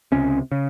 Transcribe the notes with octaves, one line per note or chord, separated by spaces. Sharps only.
C#2 C3 C#4
C#3